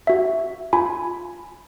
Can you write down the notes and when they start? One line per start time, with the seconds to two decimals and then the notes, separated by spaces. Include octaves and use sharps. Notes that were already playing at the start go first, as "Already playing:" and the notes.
0.07 F#4 E5
0.73 F4 G#5 B5